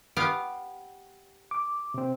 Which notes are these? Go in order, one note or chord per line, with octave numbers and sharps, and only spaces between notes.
B3 G4 F5
D6
C3 C4